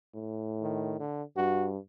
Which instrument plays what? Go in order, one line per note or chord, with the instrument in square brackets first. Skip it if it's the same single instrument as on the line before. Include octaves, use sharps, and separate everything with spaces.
[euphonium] A2
[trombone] D#3
D3
[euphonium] G2 [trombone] F#4